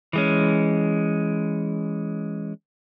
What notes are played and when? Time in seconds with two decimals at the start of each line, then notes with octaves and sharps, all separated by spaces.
0.13 E3 G#3 C#4